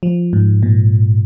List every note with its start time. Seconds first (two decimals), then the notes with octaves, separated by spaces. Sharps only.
0.03 F3
0.33 G#2
0.63 A#2